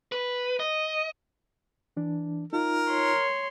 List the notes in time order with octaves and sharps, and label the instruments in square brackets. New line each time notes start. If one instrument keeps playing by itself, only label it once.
[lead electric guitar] B4
D#5
[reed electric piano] E3 D4
[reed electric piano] D#4 F4 [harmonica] A#4
[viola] C#5 C6